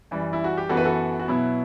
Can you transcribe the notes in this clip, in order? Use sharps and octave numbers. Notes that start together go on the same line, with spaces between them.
F#2 E3 G3
E4
F#4
G4
F#2 E3 B3 F#4 A4
B4
F#4 A4
F#4
B2 F#3 B3 E4